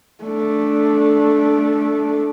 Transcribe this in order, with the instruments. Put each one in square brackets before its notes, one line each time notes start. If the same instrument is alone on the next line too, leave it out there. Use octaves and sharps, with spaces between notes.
[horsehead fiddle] A3 D4